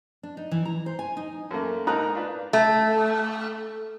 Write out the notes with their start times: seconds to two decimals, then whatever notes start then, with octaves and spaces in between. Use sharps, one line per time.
0.23 D4
0.37 D#4
0.51 E3
0.65 A#5
0.86 C5
0.99 G#5
1.17 D#4
1.51 F#2 A3 A#3
1.87 G#2 D#4 A#4 A#5 D#6 F#6
2.15 D4 F4 B4
2.53 A3